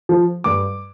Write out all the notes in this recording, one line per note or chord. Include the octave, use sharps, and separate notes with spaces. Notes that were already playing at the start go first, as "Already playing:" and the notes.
F3
G2 D6